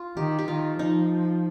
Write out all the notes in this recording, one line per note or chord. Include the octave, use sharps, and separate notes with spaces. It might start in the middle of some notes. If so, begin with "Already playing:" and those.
Already playing: F4
D#3 G4
G4
D#3 F4
F3 D#4